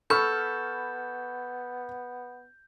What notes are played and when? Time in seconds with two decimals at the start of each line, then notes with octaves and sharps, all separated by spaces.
0.10 B3 A4 B5 C#6 F6 G6